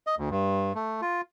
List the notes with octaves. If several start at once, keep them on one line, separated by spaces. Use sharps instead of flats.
D#5
D2
G2
A3
F4